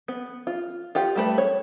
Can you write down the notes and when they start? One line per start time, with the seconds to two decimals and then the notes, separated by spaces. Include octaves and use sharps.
0.08 B3
0.47 F4
0.95 F4 G4 F#5
1.16 G3 A3 B4
1.38 C#5